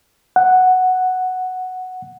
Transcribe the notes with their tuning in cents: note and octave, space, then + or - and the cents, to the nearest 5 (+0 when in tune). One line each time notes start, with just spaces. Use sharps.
F#5 +0